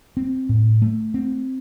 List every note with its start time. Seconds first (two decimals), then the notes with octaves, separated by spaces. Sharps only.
0.17 C4
0.49 A2
0.82 A3
1.14 C4